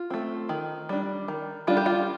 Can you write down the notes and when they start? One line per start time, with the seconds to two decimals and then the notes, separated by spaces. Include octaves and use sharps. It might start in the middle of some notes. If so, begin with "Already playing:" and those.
Already playing: F4
0.10 A3 C4
0.49 D#3
0.89 G3 D4
1.28 D#3
1.67 G3 D4 F4
1.77 G4
1.86 F4